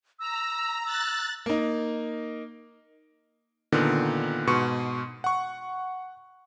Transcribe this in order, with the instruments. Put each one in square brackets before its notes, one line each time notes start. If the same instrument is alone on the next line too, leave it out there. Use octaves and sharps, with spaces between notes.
[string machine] A#5 [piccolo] E6
[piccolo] E6 [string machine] F#6 A6
[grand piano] A#3 D#4
[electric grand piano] A#2 D3 D#3 B3
G#2 B2 C6 C#6 C#7
F#5 C#6